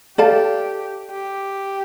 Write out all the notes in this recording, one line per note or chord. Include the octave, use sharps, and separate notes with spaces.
G4 A4 D5 F5 A5
G4